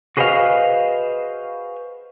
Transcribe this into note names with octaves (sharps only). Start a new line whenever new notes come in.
F#4 G#4 B4 C5 D#5 F5